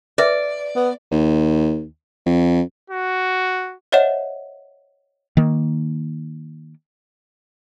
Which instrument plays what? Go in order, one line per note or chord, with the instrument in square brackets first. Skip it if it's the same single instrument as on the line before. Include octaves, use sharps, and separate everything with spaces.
[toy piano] B4 E5 [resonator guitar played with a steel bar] D5
[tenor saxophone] B3
[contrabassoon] D#2
F2
[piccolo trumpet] F#4
[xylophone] C5 C#5 D#5 E5 F#5 E7
[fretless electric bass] D#3 A#3